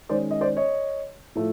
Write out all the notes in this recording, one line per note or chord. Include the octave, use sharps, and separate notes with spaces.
D#3 G#3 C#4 C5 D5
D#5
C5 D5
C#5 D#5
A2 F3 A3